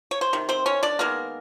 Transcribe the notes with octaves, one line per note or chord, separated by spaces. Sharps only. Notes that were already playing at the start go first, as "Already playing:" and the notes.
C#5
C5
C3 D#3
C4 C5
C#4 C#5
D4 D5
D#3 G#3 A#3 B3 A#4